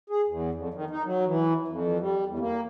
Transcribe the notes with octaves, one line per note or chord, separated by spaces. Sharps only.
G#4
E2
F2
D#3
D#4
F#3
E3
F2
G3
E2
A#3